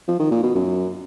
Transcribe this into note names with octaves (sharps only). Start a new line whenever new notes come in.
F3
D#3
A#2
B2
F#2